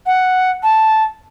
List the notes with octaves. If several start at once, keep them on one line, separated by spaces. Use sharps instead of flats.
F#5
A5